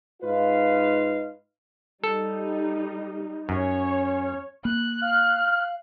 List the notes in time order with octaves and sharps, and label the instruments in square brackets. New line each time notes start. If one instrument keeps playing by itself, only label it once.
[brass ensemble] G#2 D#4 F4 B4 F5
[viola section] G3 D#4 [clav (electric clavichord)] A4
[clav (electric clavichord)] F#2 [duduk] C#4 [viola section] C#5
[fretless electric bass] A#3 [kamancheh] F#6
[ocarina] F5 [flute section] F6